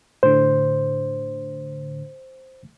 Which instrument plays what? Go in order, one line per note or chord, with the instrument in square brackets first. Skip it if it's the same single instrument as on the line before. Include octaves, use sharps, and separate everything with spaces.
[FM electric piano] A2 D3 [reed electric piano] C5